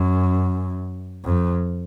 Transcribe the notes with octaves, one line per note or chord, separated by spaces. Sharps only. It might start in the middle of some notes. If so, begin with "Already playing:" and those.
Already playing: F#2
F2